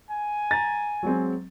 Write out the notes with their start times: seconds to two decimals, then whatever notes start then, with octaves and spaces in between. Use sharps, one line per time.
0.10 G#5
0.51 A#5 A6
1.03 F#3 G#3 C4